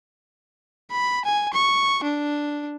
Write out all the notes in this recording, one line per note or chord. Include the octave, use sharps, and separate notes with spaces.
B5
G#5
C#6
D4